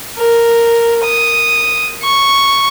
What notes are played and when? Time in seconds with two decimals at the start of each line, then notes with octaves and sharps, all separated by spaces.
0.19 A#4
1.05 D#6
2.03 C#6